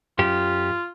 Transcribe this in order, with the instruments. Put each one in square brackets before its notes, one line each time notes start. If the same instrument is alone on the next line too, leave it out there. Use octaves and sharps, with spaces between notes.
[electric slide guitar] F#2 G4 [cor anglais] F4